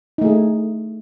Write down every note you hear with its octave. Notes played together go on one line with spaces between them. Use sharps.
A3 D#4 G#4